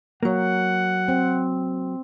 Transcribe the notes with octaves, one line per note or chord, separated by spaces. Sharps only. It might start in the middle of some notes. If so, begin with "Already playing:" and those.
F#3 A#3 F#5
C4